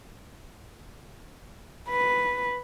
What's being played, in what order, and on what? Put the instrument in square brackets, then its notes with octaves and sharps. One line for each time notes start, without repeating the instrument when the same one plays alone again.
[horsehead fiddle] B4